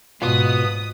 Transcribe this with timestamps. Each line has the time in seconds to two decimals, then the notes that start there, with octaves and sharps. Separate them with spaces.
0.22 G#2 B2 B3 F4 D#6